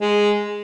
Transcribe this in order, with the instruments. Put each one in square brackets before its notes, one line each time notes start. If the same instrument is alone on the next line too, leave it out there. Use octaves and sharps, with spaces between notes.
[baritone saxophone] G#3